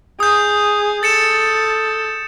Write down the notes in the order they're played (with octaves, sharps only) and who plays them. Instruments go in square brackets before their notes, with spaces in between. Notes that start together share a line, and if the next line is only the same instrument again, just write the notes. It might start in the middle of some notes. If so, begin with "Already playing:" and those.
[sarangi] G#4 [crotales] D#6 G6
[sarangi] A4 [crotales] A6 C#7 E7